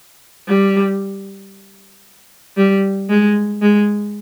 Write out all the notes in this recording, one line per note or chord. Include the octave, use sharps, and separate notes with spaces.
G3
G3
G#3
G#3